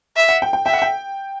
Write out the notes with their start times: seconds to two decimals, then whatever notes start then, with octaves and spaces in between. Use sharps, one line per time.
0.17 E5
0.29 F#5
0.42 G5
0.53 G5
0.66 E5 G5
0.73 F#5
0.82 G5